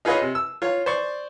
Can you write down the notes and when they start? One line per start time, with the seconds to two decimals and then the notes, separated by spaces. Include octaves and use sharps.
0.05 D#4 F4 G#4 B4 C#5 D#5
0.21 C3
0.35 E6
0.62 F4 C#5
0.86 C5 D5 C#6